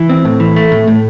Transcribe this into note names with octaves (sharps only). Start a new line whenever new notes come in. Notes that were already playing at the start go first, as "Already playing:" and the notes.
Already playing: E3
C4
A2
E3
A3
A2
A2